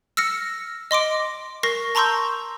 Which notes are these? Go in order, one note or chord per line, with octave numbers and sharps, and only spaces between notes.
E6 F6 A#6 C#7
D#5 C6 D6 D7
A#4 C#6 A#6 C7
A5 A#5 C6 C#6 E6 G6